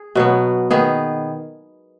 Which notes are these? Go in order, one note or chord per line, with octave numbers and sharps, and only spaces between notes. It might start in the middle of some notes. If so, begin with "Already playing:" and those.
Already playing: G#4
B2 F#3 B3
D#3 B3 G#4